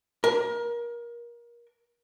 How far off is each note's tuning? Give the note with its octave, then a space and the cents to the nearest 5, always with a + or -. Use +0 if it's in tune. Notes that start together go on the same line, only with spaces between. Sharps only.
A#4 +25